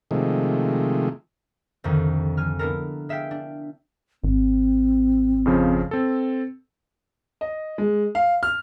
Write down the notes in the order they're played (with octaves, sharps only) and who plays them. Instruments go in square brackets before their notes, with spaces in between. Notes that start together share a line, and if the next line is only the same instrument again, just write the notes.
[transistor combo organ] C3 D#3 F3 G#3 A3
[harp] C2 F2 D3 D#3 G3
F3 G#5 F6
B3 D4 E4 F4 A4 A#4
G#3 E5 F5 G5 B6
D4
[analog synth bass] G#1 [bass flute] C4
[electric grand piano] F2 C#3 F3
C4 A4
[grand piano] D#5
G#3
F5
F6